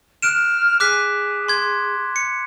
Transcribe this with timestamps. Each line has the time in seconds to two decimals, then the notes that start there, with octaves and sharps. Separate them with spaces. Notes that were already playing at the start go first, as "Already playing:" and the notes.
0.22 F6 F#6 D7 E7
0.80 G#4 D6 F#6 B6
1.48 C6 G#6
2.16 C#7